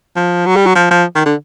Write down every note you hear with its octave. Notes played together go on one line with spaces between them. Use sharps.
F3
F#3
G3
F#3
F3
F3
D#3
D3